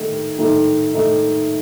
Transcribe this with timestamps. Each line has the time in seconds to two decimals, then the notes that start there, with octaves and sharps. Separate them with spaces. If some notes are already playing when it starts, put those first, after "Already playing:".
Already playing: D#3 A3 D#4
0.39 D#3 A3 D#4
0.95 D#3 A3 D#4